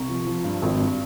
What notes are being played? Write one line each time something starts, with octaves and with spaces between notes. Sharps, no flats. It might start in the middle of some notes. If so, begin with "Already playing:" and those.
Already playing: C2 A#5 C#6
F3
F3
G2
G#1
G2